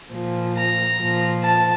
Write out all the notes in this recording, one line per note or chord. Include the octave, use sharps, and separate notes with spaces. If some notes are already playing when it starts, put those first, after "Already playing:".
A#2 F3
A#5
A#2 F3
A5